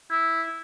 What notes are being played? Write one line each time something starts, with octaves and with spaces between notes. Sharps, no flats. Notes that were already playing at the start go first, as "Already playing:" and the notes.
E4